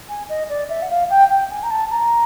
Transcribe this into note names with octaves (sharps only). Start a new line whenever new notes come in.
G#5
D#5
D5
E5
F#5
F5
G5
G5
G#5
A#5
A5
A#5